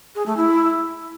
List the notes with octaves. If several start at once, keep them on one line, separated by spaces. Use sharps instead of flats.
G#4
A3
E4